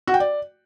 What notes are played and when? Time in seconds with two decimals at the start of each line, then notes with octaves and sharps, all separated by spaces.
0.07 F#4
0.14 G5
0.20 D5